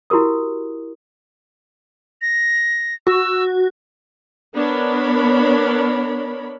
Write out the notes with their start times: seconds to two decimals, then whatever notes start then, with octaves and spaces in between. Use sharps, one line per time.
0.10 E4 F#4 G4 A#4 D#6
2.22 A#6
3.07 F#4 E6
4.55 B3 D4 A#4 C#5 B5